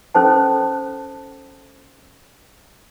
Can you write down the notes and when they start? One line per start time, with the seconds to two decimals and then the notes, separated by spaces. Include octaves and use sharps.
0.15 C#4 A4 C5 A5